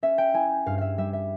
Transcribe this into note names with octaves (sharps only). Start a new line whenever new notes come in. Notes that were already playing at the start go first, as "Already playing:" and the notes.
C#4 E5
G5
E4 G#5
G2 F5
E5 F5
G3 E5
E5